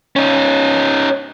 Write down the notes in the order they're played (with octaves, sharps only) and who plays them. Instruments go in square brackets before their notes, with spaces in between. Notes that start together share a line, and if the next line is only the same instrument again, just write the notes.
[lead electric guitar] C#4 D#4